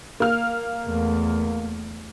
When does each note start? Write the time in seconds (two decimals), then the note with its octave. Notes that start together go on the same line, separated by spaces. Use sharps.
0.20 A#3 F6
0.85 E2 A3